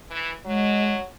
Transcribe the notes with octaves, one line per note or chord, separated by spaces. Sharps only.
E3
F#3 G#3